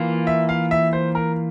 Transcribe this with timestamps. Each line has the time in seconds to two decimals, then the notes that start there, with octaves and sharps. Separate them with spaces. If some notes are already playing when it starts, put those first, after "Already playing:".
Already playing: E3 A#3 F4
0.27 E5
0.49 F5
0.71 E5
0.93 C5
1.15 A#4